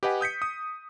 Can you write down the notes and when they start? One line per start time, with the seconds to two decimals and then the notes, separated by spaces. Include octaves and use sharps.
0.03 G4 B4 D#5 F#5 G#5
0.21 D#6 G6 B6 C#7
0.42 D#6